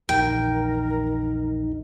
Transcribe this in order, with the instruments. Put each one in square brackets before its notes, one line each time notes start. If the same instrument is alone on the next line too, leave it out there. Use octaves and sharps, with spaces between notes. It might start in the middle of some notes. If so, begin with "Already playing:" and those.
[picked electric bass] A#1 E2 [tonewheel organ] D#4 [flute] A#4 [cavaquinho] G5